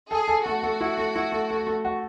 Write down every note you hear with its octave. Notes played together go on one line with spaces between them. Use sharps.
G#4 A4
A4
A3 F#4
A3
E4
A3
E4
A3
A3
A3
F#4